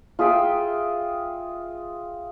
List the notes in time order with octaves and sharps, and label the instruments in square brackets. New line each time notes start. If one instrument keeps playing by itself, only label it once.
[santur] F4 G#4 E5 G5